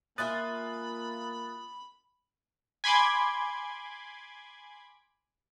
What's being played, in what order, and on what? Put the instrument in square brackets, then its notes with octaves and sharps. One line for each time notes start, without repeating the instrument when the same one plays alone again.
[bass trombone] A#3 [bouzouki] F4 E5 G#5 [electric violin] B5 [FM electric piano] D#6 F#6 A6
[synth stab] G#5 B5 C6 D6 G#6